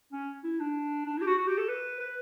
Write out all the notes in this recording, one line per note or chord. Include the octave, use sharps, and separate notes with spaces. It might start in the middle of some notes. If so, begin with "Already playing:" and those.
C#4
E4
D4
D4
E4
G4
F#4
F#4
G4
A4
B4
B4